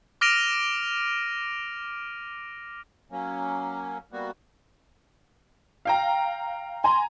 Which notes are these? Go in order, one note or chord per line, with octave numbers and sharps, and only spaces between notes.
D6 F6 A#6 D7 D#7 F7
F#3 A#3 C#4
G3 A#3 B3 F#4
F5 G5 A#5
G#5 A#5 C6